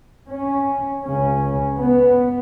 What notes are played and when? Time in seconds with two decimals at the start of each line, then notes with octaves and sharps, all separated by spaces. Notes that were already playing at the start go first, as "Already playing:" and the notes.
0.30 C#4
1.04 C#2 C#3 C#4
1.78 B3